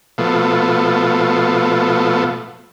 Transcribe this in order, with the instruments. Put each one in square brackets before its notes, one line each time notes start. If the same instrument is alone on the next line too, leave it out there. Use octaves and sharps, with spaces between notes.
[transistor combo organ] B2 F3 A3